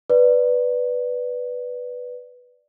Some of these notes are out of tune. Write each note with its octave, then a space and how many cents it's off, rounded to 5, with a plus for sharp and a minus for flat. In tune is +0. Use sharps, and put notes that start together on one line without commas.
B4 +0 D5 +0